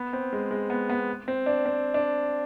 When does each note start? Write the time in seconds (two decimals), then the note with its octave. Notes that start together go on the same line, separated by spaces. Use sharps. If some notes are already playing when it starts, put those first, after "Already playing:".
Already playing: B3
0.13 C4
0.33 G#3
0.51 G#3
0.70 B3
0.90 B3
1.28 C4
1.46 D4
1.66 C4
1.94 D4